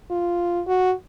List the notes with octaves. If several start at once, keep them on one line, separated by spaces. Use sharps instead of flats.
F4
F#4